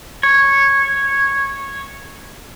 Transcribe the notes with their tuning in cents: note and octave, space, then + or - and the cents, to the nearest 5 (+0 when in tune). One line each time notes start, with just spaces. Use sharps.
C#5 -10